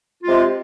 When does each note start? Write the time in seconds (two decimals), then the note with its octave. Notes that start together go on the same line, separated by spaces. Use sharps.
0.23 F4
0.26 G#3
0.29 C3